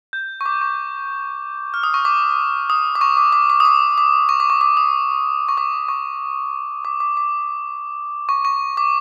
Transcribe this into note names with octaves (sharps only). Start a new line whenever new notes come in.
G6
C#6
D6
C#6
F6
D#6
C#6
D6
D#6
D6
C#6
D6
D6
D6
D#6
D6
D6
C#6
D6
C#6
D6
D#6
C#6
D6
C#6
D6
D6
D6
C#6
C#6
D6